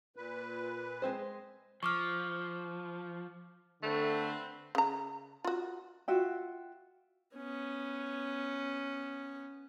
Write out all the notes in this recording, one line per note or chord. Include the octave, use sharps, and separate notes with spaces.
A#2 B4
G#3 C4 C5
F3 C#6 D6 F6
D3 A3 C4 B4 C5
C#3 A#5
F4 F#4
F4 F#4 E5 G5
B3 C#4